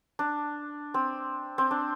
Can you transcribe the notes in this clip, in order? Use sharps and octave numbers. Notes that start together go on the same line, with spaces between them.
D4
C4
C4
D4